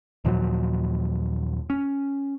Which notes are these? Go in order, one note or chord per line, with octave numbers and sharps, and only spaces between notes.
D#2 A#2 F3 F#3
C#4